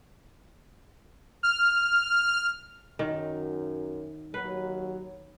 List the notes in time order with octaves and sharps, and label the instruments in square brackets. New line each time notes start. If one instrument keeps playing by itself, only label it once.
[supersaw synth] F6
[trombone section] F#2 [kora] D#3
[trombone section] D#2 F#3 [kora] B4